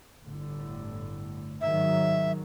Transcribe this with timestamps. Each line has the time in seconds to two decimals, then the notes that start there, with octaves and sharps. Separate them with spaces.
0.24 G1 A2 D3
1.61 G#2 D#3 F#3 E5